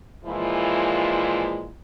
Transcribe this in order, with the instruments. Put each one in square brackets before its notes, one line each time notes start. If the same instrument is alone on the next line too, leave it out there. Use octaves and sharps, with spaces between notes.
[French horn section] A#2 E3 F3 G#3 E4